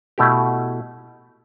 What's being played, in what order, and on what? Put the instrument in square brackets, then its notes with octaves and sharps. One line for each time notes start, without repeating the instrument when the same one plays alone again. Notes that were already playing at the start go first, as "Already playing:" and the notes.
[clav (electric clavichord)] B2 A3 E4 G4